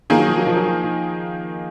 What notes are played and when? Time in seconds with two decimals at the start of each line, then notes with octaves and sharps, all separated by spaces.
0.10 D#3 F3 A#3 D#4 G#4
0.19 F#3
0.28 F3
0.38 F#3
0.47 F3
0.56 F#3
0.66 F3
0.84 F3